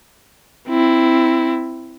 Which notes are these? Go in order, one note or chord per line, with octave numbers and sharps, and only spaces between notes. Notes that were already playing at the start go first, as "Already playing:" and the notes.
C4 E4